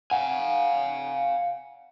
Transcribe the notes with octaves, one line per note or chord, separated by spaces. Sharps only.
F5 F#5 G#5